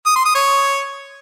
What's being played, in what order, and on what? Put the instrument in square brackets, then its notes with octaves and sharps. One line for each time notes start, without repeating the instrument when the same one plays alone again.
[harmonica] D#6
C6
D#6
C#5